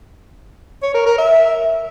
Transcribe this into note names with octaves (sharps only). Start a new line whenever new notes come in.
C#5
A#4
A#4
E5